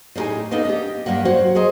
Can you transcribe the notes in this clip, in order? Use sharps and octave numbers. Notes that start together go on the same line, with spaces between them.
A2 G#3 D4 D#4 G4 G#5
A#3 B3 D4 D#4 A4
G4 D#5
G2 D#3 G3 A#3 F#5
F#3 F#4 C5 F#5
G#4 A#4 C5 D#5